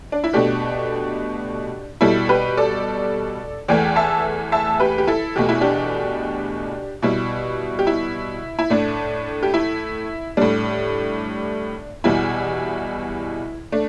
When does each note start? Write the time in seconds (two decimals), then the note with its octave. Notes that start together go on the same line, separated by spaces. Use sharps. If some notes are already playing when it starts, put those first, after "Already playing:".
0.12 D4
0.24 E4
0.33 B2 A3 D4 G4
2.01 B2 G3 E4 A4
2.29 G4 B4
2.57 A4 D5
3.68 E2 E3 A3 D5 G5
3.96 E5 A5
4.52 E5 A5
4.80 G4 B4
4.98 G4
5.07 E4 A4
5.36 E2 B2 A3 G4
5.49 E4
5.61 D4 G4
7.02 B2 G3 E4
7.79 G4
7.87 E4
8.59 E4
8.70 A2 A3 D4
9.43 G4
9.54 E4
10.37 A2 G3 D4
12.04 E2 B2 G3 E4
13.72 A3 D4